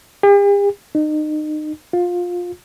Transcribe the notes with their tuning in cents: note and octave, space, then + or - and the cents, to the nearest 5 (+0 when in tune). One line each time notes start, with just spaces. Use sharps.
G4 +45
D#4 -30
F4 +20